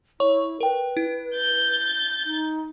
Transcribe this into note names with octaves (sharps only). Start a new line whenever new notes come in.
E4 C#5 C#6
A#4 B4 G5
E4
G6 A6
D#4